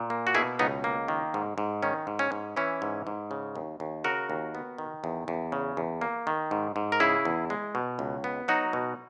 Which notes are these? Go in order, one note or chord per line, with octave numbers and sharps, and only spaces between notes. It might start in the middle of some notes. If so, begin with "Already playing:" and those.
Already playing: A#2
A#3
F#4
B2 E4 G#4
C#2 B3 D#4
A#3
D#3
G#2
G#2
D#3 C#4
G#2
C#4
G#2
E3 C#4 E4
G#2
G#2
C#3
D#2
D#2
C#3 F#4 A#4
D#2
B3
D#3
E2
E2
C#3
E2
A#3
D#3
G#2
G#2
A#4
C#3 E4 G#4
E2
G#3
B2
C#2
B3
F#3 D#4 F#4
B2